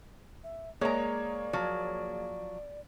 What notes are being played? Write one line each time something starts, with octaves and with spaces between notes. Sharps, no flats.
E5
G#3 A#3 G#4 C#5 D5 A#5
F3 F#3